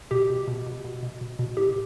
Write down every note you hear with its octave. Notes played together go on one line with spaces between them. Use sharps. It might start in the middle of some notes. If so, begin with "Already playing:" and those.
B2 G4
B2
B2
B2
B2
B2
B2
B2
A2 G4